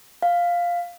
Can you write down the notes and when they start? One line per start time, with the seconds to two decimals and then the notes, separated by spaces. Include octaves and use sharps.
0.22 F5